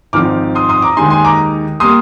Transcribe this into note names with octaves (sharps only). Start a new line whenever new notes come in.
G#1 G#2 F3 C4 D#4 D6 F6
C6 D#6
C6 D#6
A#5 D6
D#2 D#3 G#3 D#4 G#5 C6
G#5 C6
A#5 D6
G3 A#3 C6 D#6